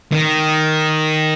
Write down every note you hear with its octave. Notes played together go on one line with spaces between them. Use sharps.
D#3